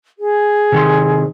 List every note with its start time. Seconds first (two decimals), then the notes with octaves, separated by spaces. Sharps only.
0.18 G#4
0.72 C3 D#3 C6